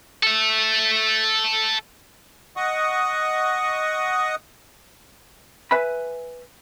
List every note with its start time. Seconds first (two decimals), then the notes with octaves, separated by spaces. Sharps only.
0.23 A4 E5
2.57 D#5 F#5 C#6 D#6
5.71 B4 E5 G#5 B5